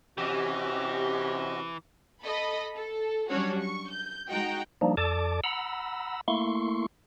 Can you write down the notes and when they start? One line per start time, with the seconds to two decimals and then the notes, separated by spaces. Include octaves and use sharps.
0.18 C3 E3 C#4 F#4 G4 D#5
2.23 A4 D#5 B5
2.75 A4
3.29 F#3 G3 C#4 D4 F#4 C#5
3.61 C#6
3.91 G6
4.30 G#3 D#4 F#4 F#5 G5 A#5
4.81 F3 G3 A#3 D4 D#4
4.97 F2 A4 D5 A5 D6
5.44 F#5 A#5 B5 E6
6.28 A3 A#3 E4 C6 C#6